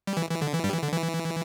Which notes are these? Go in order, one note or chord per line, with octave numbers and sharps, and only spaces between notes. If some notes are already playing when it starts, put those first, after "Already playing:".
G3
E3
E3
D3
E3
G2 G3
E3
D3
E3